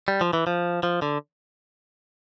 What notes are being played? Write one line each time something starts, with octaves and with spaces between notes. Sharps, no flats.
G3
F3
E3
F3
F3
D3